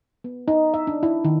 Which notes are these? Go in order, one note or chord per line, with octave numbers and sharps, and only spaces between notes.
B3
D#4
E5
D4
E4
D#3